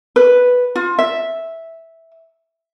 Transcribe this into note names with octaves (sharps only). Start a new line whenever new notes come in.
B4
F4
E5